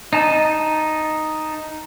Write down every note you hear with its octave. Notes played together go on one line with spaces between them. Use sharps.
D#4 A5